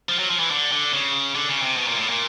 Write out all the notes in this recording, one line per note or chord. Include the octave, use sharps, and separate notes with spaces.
F3
F#3
F3
E3
D3
D3
C#3
D3
C#3
C3
B2
A#2
A2
A#2